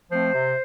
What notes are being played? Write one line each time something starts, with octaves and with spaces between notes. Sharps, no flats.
F3 A3 C4 C5
C3